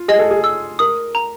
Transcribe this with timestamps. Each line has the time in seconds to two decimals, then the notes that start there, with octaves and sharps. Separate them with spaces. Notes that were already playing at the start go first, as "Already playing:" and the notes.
Already playing: F4
0.08 G#4 D#5
0.19 A4
0.31 G#4
0.44 E6
0.79 A#4 D#6
1.15 A#5